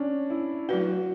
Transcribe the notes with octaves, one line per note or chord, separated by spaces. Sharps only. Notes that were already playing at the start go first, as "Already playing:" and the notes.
Already playing: C#4 D4
E4
F#3 A3 E4 F#4 B4